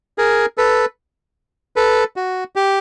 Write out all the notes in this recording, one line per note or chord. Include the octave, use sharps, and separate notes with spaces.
G#4 A#4
A4 B4
A4 B4
F#4
G4